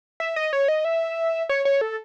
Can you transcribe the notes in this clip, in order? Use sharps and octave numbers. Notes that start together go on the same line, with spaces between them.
E5
D#5
C#5
D#5
E5
C#5
C#5
A4